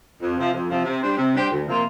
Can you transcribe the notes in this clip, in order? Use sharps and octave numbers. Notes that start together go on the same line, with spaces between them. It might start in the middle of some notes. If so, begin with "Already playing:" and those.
F2
C3 F3
F2
C3 F3
C3
G3 D4 G4 C5
C3
G3 D4 G4 C5
D2
C3 F3 A#3 F4